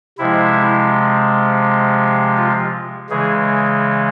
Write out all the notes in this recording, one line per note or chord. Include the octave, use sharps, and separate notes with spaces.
C3 F3 G#3 E4
F4
C#3 E3 G#3 G#4